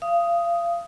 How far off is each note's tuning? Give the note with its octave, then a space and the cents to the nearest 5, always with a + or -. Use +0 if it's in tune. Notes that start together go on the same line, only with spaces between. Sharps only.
F5 -30 D#6 +5